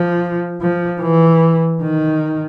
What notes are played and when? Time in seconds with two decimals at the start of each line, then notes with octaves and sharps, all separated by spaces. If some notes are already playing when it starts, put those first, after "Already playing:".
Already playing: F3
0.61 F3
1.01 E3
1.82 D#3